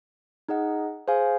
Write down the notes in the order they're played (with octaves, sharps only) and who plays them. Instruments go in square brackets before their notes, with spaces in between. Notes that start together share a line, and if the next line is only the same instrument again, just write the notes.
[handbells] D#4 G#4 D#5 F#5
G#4 C5 F5 G#5